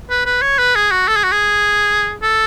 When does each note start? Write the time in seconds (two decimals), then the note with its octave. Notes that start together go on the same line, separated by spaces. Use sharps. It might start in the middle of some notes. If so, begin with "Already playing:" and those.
0.10 B4
0.26 B4
0.42 C#5
0.59 B4
0.75 G#4
0.91 F#4
1.08 A4
1.16 G#4
1.24 F#4
1.32 G#4
2.23 A4